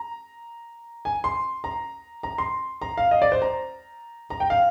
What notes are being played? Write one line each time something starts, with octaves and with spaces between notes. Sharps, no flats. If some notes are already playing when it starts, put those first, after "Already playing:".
Already playing: A#5
G#5
C6
A#5
A#5
C6
A#5
F5
D#5
D5
C5
A#5
A#5
G5
F5